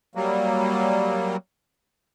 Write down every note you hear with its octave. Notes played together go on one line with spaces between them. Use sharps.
F#3 G3 A#3